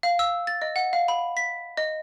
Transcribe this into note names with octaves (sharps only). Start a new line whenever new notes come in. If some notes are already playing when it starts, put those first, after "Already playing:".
F5
E6
A6
D#5
F#5
F5
B5
B6
D#5